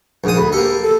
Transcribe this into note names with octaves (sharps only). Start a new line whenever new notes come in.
A#1 G#2 D#6
D2 B5
A#3 G4 A4
A4